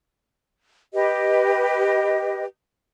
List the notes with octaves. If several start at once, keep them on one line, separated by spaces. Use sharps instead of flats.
G4 B4 D#5